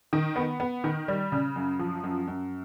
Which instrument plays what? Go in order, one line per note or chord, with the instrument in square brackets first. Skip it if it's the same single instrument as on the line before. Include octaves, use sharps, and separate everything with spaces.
[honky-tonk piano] D#3
B3
B3
D#3
G3
C#3
F#2
F3
F#2
F#2